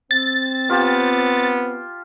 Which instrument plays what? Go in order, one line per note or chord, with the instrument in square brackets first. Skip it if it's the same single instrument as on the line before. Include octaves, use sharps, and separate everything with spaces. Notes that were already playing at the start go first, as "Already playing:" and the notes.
[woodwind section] C4 [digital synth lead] A6
[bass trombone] B3 [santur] F4 G4 A5